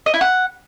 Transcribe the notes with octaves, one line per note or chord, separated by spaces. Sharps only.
D#5
E4
F#5